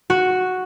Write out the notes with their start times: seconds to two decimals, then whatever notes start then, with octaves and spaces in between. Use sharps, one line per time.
0.10 F#4